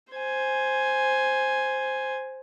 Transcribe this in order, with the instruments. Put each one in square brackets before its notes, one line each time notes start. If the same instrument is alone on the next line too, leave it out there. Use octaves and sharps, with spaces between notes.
[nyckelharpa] C5 G#5